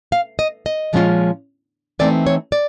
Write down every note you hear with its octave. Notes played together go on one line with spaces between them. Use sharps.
F5
D#5
D#5
A#2 F3 G#3 C#4 F4
E3 A3 C4 D#4 D5
C#5
D5